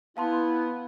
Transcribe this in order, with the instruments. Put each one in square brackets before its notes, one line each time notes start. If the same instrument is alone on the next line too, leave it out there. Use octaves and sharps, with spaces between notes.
[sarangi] B3 [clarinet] E4 [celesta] F5 A5 C6